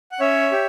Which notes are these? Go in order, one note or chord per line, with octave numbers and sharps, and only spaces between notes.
F#5
C#4 C#5 E5
G4